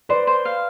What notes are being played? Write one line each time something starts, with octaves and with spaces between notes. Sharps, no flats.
B4 C5 D5
C5
F5